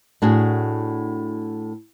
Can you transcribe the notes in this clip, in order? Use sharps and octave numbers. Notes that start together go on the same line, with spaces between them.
A2 D4 F#4 G#4